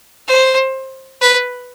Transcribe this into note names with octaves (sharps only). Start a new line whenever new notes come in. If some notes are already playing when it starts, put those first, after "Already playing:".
C5
B4